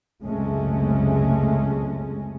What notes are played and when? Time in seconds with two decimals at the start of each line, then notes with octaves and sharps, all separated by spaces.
0.23 C#2 F#2 C3 G#3 A3 C#4